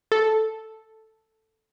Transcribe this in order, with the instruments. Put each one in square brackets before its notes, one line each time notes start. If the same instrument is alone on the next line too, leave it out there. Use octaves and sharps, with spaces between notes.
[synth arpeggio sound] A4